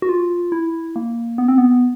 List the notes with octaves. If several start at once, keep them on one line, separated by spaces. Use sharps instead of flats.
F#4
F4
E4
A#3
B3
C4
B3